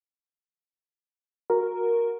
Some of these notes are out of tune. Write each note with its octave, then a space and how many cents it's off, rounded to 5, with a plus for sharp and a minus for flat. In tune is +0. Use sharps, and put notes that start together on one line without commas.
F#4 -15 A#4 +0